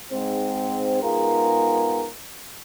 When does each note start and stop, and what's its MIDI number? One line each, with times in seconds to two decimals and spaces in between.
0.12 0.99 44
0.12 0.99 60
1.03 2.06 44
1.03 2.06 59
1.03 2.06 65
1.03 2.06 68
1.03 2.06 70